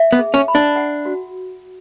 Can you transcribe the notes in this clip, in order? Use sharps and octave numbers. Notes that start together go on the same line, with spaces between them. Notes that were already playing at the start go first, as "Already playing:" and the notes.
Already playing: E5
B3
G#4
C#4
B5
D4
F#5
F#4